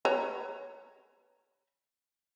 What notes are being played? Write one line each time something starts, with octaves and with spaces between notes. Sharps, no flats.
B4 C#5 A#5